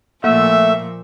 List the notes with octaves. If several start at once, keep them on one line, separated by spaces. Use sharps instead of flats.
A#2 F3 A3 A#3 E5